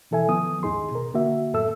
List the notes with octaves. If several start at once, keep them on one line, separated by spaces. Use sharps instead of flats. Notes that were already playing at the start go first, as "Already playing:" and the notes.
B2 E3 A4 E5 G#5
D#3 F3 B3 D#6
D#2 G#2 D#4 G#4 C6
B2 A#4
D3 A#3 F#4 E5
F#2 A2 A4 E5 E6